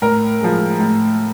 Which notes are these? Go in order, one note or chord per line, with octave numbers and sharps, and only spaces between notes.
A2 A#4
F3 G#3
A2